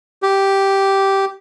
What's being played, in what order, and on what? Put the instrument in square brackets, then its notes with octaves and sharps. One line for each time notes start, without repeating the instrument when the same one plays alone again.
[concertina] G4